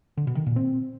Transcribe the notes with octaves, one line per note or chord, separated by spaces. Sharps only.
D3
B2
D#3
A#2
C4